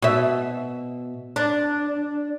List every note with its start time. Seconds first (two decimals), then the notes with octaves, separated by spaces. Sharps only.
0.02 B2 E5
1.36 D4